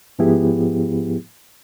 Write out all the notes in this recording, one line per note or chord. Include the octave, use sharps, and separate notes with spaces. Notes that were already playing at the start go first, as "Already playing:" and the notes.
G#2 F3 B3 E4 G4 G#4